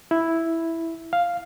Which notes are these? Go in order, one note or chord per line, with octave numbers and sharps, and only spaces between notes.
E4
F5